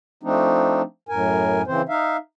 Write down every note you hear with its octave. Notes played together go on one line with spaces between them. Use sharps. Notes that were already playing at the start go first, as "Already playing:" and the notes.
F3 A3 C4 D4 D#4
F#2 A2 A#4 G#5
C#3 E3 C4 C5
D#4 E5 F5